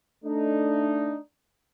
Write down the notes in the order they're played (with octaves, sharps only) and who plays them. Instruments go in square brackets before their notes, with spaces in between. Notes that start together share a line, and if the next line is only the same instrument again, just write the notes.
[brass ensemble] A3 D4 D#4